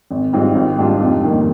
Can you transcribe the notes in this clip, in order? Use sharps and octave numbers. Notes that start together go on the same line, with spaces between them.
G#1
G#2 G3 C4 F4
G#1
G#2 G3 D4 F4
F1
D#2 D#3 G3